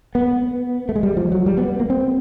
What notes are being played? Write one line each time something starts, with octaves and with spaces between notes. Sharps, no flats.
B3
A3
G#3
G3
F3
F#3
G3
B3
B3
A#3
C4